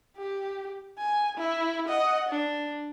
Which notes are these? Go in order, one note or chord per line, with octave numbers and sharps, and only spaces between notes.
G4
G#5
E4
D#5 F#5
D4